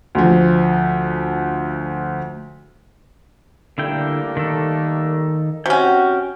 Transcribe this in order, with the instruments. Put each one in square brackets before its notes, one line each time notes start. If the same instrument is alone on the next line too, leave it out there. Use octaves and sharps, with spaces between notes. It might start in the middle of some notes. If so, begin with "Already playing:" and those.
[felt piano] D2 F3
[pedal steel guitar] D3 E4 G5 [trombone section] G3 A3 A#3
[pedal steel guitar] D#3 A4
[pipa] C3 C#4 [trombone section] F#4 [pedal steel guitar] G5